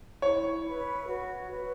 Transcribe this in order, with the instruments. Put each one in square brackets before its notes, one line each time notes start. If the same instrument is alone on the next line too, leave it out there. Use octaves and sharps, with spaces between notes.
[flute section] E4 [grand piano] C#5
[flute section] B4 E5 B5
F#4
B4 E5